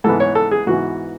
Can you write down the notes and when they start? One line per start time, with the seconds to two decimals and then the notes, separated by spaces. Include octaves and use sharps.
0.04 G#2 E3 B3 A4
0.20 C#5
0.35 A4
0.51 G#4
0.67 G#2 E3 B3 F#4